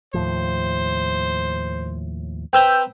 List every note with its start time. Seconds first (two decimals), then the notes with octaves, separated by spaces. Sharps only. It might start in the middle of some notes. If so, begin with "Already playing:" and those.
0.14 D#2 A2 F3 C5
2.53 C4 B4 G5 A#5 E6 G6